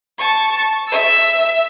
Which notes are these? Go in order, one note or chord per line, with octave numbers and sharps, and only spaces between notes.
A5 C#6
E5 E6